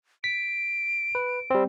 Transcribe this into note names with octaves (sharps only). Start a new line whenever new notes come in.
B6 D7
B4
G3 C4